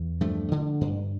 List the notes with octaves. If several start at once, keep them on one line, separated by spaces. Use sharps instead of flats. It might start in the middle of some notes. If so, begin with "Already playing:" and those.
Already playing: E2
G2 F3 A3
D3
G2